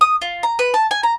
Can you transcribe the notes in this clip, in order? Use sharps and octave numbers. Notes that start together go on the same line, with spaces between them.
D#6
F4
A#5
B4
A5
G#5
A#5